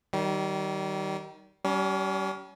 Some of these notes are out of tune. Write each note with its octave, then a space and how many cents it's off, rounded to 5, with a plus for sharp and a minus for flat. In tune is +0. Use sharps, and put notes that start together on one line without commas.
D#3 +0 G3 -30
G3 -30 C#4 +30